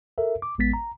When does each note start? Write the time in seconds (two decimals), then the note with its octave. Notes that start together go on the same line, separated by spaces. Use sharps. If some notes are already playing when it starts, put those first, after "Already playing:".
0.18 A4 A#4 E5
0.42 D6
0.58 A1 G#3 B3 A6 B6
0.73 A#5